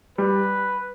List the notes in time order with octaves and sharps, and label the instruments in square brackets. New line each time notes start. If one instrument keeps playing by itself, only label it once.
[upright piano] G3 [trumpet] B4